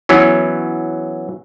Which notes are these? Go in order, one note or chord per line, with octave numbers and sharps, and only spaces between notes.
E3 F#3 B3 C#4